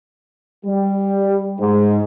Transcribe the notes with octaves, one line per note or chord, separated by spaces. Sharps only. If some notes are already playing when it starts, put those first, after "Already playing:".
G3
G#2